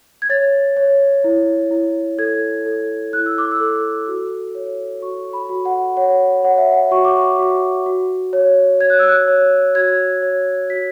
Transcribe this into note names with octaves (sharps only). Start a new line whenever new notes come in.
G#6
C#5 A6
C#5
E4
E4
A4 G#6
A4
E4 F#6
E6
D6
E6
A4
F#4
C#5
F#4 C#6
B5
F#4
F#5
C#5 F#5
C#5 F#5
E5
F#5
F#4 C#6
D6
C#6
F#4
F#4
C#5
C#5 G#6
F#6
E6
F#6
C#5
F#4 G#6
C#5
F#4 B6